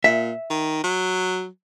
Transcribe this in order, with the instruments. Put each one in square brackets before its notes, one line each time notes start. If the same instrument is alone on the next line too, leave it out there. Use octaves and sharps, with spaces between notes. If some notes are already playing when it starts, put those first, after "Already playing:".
[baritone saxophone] A#2 [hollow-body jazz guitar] E5
[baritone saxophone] D#3
F#3